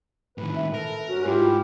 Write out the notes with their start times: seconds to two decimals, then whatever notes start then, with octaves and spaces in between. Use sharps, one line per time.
0.38 A2 D#3 B4
0.55 E5
0.74 A4 A#4
1.07 G2 C#4 F#4
1.26 G#2 E4 F4 G4